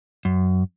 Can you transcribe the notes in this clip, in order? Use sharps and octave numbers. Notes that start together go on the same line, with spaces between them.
F#2